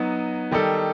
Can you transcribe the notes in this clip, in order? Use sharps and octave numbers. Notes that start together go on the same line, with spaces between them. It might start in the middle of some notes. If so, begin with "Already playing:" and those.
Already playing: F#3 B3 D#4
D#3 G3 D#4 A4